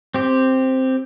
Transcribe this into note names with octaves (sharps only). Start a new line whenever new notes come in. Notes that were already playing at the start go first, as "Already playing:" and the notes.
C4 G4